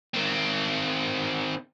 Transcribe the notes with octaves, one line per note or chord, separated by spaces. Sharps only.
D#3 C4